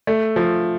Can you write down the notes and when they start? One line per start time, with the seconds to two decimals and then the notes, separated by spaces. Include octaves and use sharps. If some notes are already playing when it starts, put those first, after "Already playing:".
0.07 A3
0.36 F3